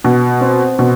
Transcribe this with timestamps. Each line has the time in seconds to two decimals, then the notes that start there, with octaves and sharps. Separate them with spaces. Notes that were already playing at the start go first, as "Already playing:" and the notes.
0.04 B2
0.41 C4
0.79 B2